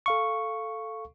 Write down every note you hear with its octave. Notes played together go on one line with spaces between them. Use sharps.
A4 F5 C#6